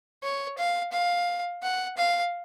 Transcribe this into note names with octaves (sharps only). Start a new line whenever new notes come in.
C#5
F5
F5
F#5
F5